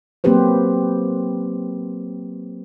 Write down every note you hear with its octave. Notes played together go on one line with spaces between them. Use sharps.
F#3 A#3 C4 G4 B4 C5